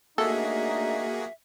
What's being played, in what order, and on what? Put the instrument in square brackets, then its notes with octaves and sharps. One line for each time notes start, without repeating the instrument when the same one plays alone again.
[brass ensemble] A3 D4 D#4 [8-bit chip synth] A#3 F#4 G#4 [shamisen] A4 [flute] E5